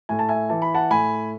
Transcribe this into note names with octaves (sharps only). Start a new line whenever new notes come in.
A2 G#5
A5
E5 G#5
E3 A5
B5
F#5 A5
A2 G#5 B5